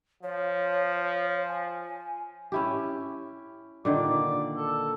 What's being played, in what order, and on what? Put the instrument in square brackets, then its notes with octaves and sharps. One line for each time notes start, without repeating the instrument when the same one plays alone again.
[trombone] F3 [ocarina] C#5
[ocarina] G#5
[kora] C#4 E4 G4
[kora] A#2 D3 D#3 [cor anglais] D5
[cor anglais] A4